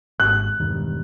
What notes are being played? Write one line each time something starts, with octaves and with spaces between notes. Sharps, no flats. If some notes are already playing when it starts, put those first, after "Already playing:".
G#1 F#6
E1 G2 D#3